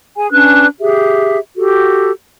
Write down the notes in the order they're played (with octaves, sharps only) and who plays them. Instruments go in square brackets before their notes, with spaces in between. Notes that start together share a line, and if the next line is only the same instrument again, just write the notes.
[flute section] G#4 G#5
C#4 D4 B4 F#6
G4 G#4 E5
F#4 G4 A4